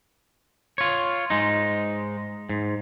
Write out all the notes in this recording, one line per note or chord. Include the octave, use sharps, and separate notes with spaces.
F4 C#5
G#2 G#3 D#4
G#2